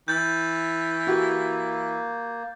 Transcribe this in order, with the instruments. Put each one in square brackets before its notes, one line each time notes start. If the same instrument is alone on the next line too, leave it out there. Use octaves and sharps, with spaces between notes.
[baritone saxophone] E3 [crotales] G6 A6
[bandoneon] A#3 [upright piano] F#4 G4